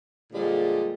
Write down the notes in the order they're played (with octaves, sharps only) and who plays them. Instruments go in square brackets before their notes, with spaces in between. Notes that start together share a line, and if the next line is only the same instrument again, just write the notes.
[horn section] A#2 D3 F3 G3 G#3